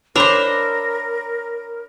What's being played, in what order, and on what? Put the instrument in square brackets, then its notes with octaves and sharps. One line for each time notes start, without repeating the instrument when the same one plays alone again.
[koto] D4 C5 [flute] A#4 [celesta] C#5 B5 D6 [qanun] E5 A#5